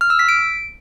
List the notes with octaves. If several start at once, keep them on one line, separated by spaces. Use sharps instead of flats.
F6
E6
B6
D7